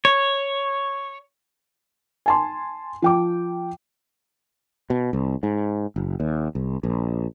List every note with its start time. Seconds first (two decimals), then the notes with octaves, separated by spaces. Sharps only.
0.05 C#5
2.26 G#5 A5 C6
3.02 F3 G5 D6
4.90 B2
5.13 C2
5.43 G#2
5.96 F#1
6.20 D#2
6.55 C2
6.83 A#1